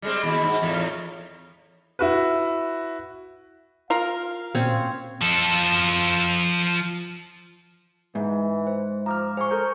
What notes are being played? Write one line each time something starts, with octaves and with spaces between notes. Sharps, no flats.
G3 G#3 C4
D#2 B2
G#2
E2 A2
E4 F#4 B4
F4 A#4 F5
A#2 C4 C#4 C#5
F3 A4
G#2 E3
C5
F3 A#5 D6 F6
G#4 C5 G#5 C#6
A4 A#4 C5 G6